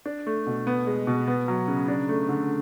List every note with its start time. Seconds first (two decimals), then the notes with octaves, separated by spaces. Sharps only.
0.06 D4
0.27 A3
0.46 B2
0.67 B3
0.87 G#3
1.07 B2
1.28 B3
1.48 F#3
1.68 C#3
1.88 D4
2.09 A3
2.29 D3